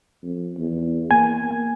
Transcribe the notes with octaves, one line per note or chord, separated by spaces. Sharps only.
F2
E2
A#3 G#5